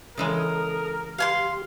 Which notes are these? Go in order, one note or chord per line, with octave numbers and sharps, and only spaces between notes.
C#3 E3 G#3 A4 A#4 D#6
G4 F5 G#5 C6